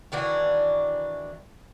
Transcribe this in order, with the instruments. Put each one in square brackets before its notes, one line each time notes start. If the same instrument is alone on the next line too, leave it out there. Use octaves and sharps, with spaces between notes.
[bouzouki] D#3 E3 D4 F#4